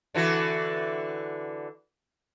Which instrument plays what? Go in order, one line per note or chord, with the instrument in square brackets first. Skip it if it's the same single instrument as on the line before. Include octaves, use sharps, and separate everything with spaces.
[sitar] D3 E3 F#4